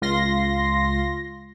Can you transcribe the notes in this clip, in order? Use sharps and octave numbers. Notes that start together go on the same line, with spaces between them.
C#2 F4 C6 A#6